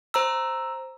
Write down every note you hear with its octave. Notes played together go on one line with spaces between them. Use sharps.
C5 A#5 E6